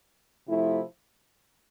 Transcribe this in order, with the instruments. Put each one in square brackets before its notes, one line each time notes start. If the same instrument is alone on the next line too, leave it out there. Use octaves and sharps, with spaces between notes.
[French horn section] C3 F3 A3 E4